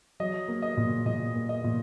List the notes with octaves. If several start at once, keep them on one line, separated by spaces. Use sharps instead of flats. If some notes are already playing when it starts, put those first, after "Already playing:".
F#3 D#5
A#3
D#5
A#2
A#2 D#5
A#3
D#5
A#2